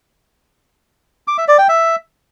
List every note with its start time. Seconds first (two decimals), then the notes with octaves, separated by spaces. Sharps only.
1.28 D6
1.38 E5
1.48 D5
1.58 G5
1.69 E5